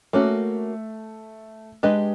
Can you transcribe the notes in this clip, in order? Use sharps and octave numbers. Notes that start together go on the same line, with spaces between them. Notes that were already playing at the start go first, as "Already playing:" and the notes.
A3 A#3 C#4 F#4
G#3 D4 G4 B4 D#5